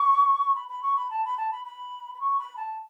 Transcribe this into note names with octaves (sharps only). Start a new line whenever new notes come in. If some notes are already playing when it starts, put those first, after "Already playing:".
Already playing: C#6
B5
B5
C#6
B5
A5
B5
A5
B5
B5
B5
C#6
B5
A5